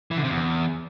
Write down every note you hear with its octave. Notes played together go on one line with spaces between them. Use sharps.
E3
D3
C3
E2